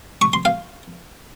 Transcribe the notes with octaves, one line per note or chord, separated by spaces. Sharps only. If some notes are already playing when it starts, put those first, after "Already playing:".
C#6
C6
F5